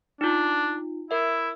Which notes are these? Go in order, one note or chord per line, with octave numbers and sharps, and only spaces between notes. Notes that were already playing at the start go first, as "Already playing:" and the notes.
D4 D#4 F4
E4 A#4 E5